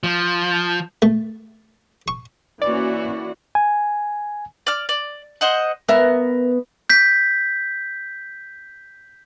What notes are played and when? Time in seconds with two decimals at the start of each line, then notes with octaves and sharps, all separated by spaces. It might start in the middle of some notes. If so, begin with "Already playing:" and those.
0.03 F3
1.02 A3
2.08 C#6
2.62 E3 A#3 C#4 F#4 D5
3.55 G#5
4.67 D5 F6
4.89 D5
5.41 C5 D#5 F#5
5.89 B3 A#4 E5
6.90 G6 B6